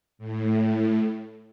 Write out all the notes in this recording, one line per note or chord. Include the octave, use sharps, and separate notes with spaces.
A2